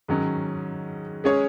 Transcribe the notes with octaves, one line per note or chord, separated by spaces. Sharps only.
G#2 D#3 F#3 C#4
G#3 C#4 G#4 C#5